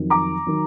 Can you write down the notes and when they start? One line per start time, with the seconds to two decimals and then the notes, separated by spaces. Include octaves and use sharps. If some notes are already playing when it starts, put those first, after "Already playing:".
Already playing: F2 D#3 F#3
0.10 A#5 D6
0.47 D#3 F#3